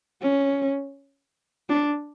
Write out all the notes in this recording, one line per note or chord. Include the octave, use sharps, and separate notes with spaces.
C#4
D4